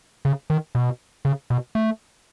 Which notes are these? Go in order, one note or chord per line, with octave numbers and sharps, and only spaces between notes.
C#3
D#3
B2
C#3
B2
A3